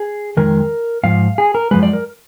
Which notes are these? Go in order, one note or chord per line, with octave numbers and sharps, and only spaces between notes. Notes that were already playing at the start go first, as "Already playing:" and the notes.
Already playing: G#4
F2 D#3 G#3 A#4
G#2 F3 F5
G#4
A#4
F#2 F3 G#3 B4
D5
A#4